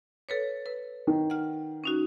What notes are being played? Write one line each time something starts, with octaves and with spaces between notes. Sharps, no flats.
A4 B4 C#5
B4
D#3
F#5 F6
C#4 D#4 F#4